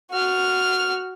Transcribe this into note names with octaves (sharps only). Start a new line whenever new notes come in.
F#4 F6